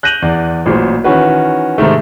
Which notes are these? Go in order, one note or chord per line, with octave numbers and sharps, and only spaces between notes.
F#6 G6 A#6 D#7 F7 F#7
E2 D5
A1 A#2 F#3 C5
D#3 E3 C#4 F#4 B4
G#2 C3 D#3 A3